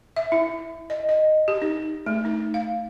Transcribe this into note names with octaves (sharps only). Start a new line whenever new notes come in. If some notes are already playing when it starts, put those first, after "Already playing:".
E5
E4
D#5
D#5
G4
D#4
A3
D#4
F5